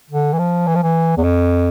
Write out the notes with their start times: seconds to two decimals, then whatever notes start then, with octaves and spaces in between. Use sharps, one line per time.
0.10 D3
0.33 E3
0.39 F3
0.67 E3
0.75 F3
0.83 E3
1.17 E2
1.23 F2